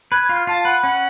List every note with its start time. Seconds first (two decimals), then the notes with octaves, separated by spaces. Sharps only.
0.12 B4 G#6
0.24 G#6
0.29 F4
0.36 F6
0.47 F4 A5
0.65 B4 F#5
0.83 C#4 F#5